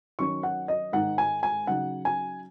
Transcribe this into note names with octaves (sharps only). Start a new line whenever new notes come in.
D#3 F#3 C#4 C#6
F#5
D#5
G#2 D#3 G#3 D#4 F#5
G#5
G#5
C#3 F#3 D#4 F#5
G#5